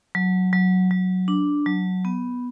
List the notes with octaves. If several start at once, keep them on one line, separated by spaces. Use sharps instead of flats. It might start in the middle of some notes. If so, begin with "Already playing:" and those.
F#3
F#3
F#3
D4
F#3
B3